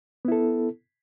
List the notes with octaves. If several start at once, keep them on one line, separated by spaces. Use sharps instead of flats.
B3 E4 A4